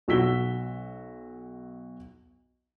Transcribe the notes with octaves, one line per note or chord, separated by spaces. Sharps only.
B1 F#4 E6 B6 G7